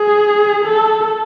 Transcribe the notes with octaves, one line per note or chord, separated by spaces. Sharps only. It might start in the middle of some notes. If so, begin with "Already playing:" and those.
Already playing: G#4
A4